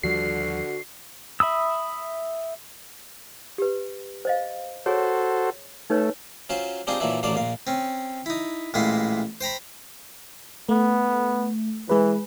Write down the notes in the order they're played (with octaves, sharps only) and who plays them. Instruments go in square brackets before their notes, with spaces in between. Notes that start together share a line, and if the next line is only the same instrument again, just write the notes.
[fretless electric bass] D#2 F3 G3 [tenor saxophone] D3 [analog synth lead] F#4 [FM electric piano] C7
[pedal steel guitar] E5 B5 D#6 E6
[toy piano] G4 B4
C5 D#5 F5
[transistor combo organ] F#4 A4 C5 [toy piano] G#4 C#5
[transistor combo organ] A3 [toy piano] D#4 B4 C#5
[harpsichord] F#3 C#4 F4 C5
G3 C4 D4 D#4 F4 G#4
A#2 E3 F#3 D4 E4
A1 D#3 F#3 D4 D5 F5
A#1 A#2 F5
C4 C#4
D#4 E4
A1 A#2 G#3 E4 C6
C5 G5 A#5 B5
[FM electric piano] A3 [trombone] B3
[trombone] E3 [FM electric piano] G#3 G#4 B4